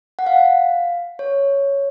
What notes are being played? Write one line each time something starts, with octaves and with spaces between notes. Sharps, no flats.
F#5
F5
C#5